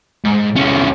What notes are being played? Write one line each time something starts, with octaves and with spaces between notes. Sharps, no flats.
G#2
C2 C#4